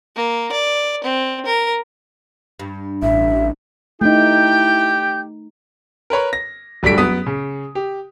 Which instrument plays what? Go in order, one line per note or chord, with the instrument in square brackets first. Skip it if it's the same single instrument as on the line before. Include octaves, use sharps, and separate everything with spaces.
[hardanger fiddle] A#3
D5
C4
A#4
[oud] G2
[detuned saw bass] A1 [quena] E5
[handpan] A3 D#4 [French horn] E4 [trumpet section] G4 G5 [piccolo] G6
[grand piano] A#4 B4 C#5 B5
A#6
D1 G2 D4 A4 B6 D7
F#2 B3 D#6 B6
C#3
G4